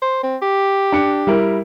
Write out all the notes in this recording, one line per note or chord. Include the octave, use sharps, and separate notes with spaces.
C5
C4
G4
D4 C#7
G3 E4 A#4